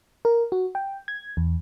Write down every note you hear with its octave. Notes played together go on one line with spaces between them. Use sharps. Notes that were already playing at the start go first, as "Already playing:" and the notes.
A#4
F#4
G5
G#6
E2